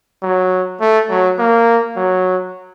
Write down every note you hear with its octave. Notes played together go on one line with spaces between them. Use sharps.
F#3
A3
F#3
A#3
F#3